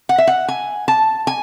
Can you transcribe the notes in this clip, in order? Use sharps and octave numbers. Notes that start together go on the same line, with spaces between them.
F#5
E5
F#5
G#5
A5
G#5